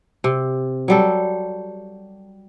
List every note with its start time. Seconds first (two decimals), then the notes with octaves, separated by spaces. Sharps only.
0.24 C3
0.88 F#3 G3 A4